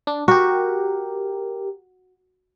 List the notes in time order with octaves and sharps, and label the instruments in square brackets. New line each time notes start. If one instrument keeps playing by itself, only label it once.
[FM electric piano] D4
[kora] F#4 [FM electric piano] G4 A#4